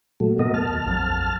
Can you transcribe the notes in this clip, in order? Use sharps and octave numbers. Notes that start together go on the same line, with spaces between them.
A#2 F#3 A3
A#2 B3 A#4 D#5
F2 A5 F6
D#2
A#1 F2 F#3